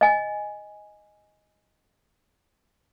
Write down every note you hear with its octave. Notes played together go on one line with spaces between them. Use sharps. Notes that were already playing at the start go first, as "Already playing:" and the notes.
D#5 G#5